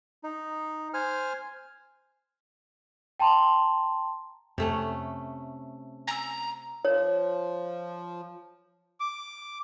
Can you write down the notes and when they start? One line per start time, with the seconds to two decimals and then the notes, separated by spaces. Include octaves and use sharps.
0.24 D#4
0.94 C5 G#5 F6
3.20 G5 A5 A#5 C6
4.58 F2 C3 A3 C#4
6.08 G#5 A#5 E6
6.85 F3 C#5
9.00 D6